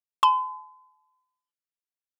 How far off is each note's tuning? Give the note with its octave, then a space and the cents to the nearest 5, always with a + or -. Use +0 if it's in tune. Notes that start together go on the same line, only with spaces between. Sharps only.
A5 -40 C6 -45